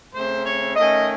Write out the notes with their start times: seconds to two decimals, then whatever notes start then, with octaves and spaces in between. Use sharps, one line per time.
0.14 C#3 A3 C4 C5
0.45 C#5
0.76 D#3 A3 C#4 D#5